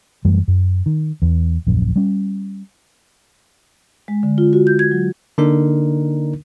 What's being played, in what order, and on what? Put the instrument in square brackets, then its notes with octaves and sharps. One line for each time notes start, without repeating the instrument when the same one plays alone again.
[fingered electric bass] F#2 E3 G3 A3
F#2
D#3
E2 E3
D#1 A#1 F#2
G3 C#4
[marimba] G#3
D3
F4
F#4
G6
G#6
F#3
[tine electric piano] D3 A#3 D4 D#4 A#4